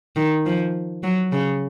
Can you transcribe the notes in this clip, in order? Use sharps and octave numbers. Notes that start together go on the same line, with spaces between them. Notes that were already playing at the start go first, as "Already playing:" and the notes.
D#3
F3
F#3
C#3